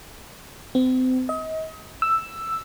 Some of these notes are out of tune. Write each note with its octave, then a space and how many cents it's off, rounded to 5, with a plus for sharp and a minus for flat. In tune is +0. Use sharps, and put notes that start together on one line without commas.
C4 -35
D#5 +35
E6 +5